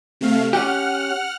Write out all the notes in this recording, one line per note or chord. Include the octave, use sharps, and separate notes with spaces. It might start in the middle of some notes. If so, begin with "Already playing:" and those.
C3 A3 F5
C#4 G4 F#5 F6 F#6